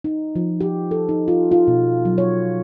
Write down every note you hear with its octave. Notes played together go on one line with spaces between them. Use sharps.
D#4
F3
G4
A4
D#4
F4
F4
B2
F#3
C#5